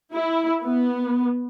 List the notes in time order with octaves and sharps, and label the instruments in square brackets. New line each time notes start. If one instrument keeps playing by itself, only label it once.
[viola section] E4
B3